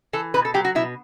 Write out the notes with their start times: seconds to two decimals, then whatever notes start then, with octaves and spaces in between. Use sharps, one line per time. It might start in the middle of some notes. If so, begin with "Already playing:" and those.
0.13 E3 A4
0.34 B2 B4
0.45 A4
0.54 F#3 G4
0.65 F#4
0.75 B2 E4